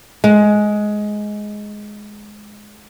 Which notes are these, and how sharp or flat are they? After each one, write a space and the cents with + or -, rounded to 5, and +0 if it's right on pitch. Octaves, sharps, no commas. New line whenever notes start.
G#3 +10